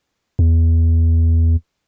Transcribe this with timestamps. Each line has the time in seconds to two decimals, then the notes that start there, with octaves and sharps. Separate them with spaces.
0.39 E2